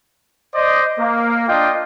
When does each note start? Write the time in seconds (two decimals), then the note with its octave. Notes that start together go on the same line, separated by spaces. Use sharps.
0.54 C5 D5 D#5
0.99 A#3
1.48 D4 F4 D#5 G5